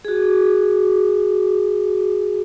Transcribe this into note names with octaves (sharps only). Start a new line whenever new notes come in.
F#4 G#4